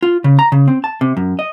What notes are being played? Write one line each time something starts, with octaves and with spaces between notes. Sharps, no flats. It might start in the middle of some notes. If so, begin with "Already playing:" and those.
F4
C#3
A#5
C#3
C4
A5
C3
F#2
D#5